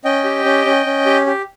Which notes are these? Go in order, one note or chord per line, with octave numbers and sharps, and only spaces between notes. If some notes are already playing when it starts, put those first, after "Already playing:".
C#4 D#5 G5
G4
C#4
C#4
C#4
G4
G4